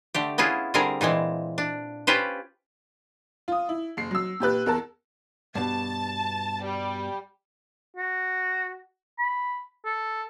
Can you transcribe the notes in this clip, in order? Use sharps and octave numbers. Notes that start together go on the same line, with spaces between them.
D3 A3 G4
B3 C#4 E4 F4 G#4
D3 G3 C4 G#4 A#4
A#2 E3 G#3 C4
D4
C#4 F4 G4 B4 C5
F4 D#6
E4
F#1 C7
F#3 E6
A#2 G4 B4 F#6
E2 A#4 A5
G2 B2 A5
G3
F#4
B5
A4